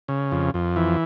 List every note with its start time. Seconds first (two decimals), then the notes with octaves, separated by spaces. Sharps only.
0.08 C#3
0.32 F2
0.54 F2
0.76 E3